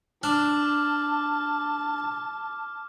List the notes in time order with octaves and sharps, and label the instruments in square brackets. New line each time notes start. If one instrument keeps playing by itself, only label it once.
[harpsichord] D4 [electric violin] A5 [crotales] D6 F6